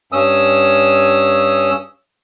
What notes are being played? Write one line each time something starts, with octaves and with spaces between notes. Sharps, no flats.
G2 C#4 D#6 E6